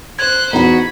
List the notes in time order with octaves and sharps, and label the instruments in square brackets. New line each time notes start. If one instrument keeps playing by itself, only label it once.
[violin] C5 F#6 [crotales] G#6
[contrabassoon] E2 [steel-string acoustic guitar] D#4 F#4 [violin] B5